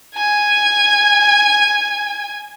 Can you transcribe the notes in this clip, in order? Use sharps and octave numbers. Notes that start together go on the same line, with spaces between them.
G#5 G#6